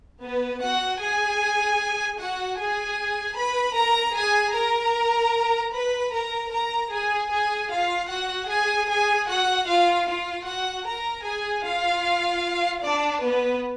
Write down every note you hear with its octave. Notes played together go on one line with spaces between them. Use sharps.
B3 B4
F#4 F#5
G#4 G#5
F#4 F#5
G#4 G#5
B4 B5
A#4 A#5
G#4 G#5
A#4 A#5
B4 B5
A#4 A#5
A#4 A#5
G#4 G#5
G#4 G#5
F4 F5
F#4 F#5
G#4 G#5
G#4 G#5
F#4 F#5
F4 F5
F4 F5
F#4 F#5
A#4 A#5
G#4 G#5
F4 F5
D4 D5
B3 B4